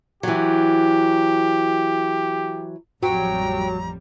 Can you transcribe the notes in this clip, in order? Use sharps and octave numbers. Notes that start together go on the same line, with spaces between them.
E3 F#3 G4
A1 F2 F#3 G3 G5 A#5